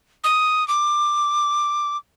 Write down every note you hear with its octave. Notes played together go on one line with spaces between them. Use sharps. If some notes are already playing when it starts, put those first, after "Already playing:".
D#6
D6